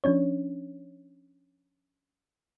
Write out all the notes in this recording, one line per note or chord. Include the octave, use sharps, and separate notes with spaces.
F3 C#4 D4 C#5